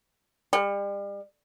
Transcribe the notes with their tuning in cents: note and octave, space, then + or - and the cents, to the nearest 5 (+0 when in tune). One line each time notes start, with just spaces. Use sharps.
G3 +35